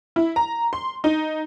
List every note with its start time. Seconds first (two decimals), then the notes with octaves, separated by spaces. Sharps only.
0.16 E4
0.36 A#5
0.73 C6
1.04 D#4